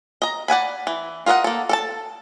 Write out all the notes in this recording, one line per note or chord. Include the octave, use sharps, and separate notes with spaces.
D#5 A#5
D5 F#5 G#5 B5
E3
F4 A#4 D#5 E5 F#5
A#3 A4
A4 A#4 A5